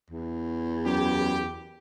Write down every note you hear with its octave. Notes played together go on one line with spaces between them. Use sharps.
E2
F#2 G4